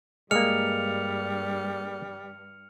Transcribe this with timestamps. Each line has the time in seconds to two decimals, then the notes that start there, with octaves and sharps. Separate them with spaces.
0.31 G2 G3 G#3 A#3 F6 C#7 F7